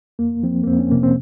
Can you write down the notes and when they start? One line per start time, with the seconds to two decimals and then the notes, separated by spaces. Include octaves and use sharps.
0.19 F2 A#3
0.43 F3 C4
0.63 A#3
0.67 F2 C4
0.79 C#4
0.91 C3 A#3
1.03 C4